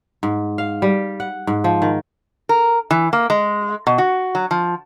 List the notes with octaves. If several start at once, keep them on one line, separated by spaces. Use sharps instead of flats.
G#2
F5
G3
F#5
G#2
F3
D#3
A#4
E3
A#3
G#3
B2
F#4
F#3
F3